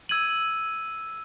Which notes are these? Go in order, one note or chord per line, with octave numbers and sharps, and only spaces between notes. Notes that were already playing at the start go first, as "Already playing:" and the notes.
E6 G#6 D#7 F#7